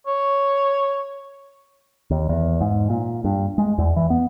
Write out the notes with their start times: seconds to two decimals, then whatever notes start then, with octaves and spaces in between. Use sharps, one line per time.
0.07 C#5
2.10 D#2
2.29 E2
2.61 G#2
2.90 A#2
3.25 G2
3.58 G#3
3.78 E2
3.96 E3
4.10 B3